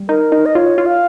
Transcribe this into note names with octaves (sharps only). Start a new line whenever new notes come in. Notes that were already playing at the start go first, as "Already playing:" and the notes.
Already playing: G3
D#4 A#4
D#4
D#5
F4 C#5
F4
F5